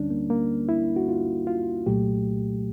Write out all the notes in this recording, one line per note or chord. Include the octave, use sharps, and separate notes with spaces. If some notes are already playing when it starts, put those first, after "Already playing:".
Already playing: D2 D3 G3 C#4 D4
A#3
A#3
E4
F#4
F4
F4
C2 A#2 F#3 A3 G4